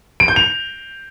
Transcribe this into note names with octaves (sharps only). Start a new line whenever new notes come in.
D7
G6
F7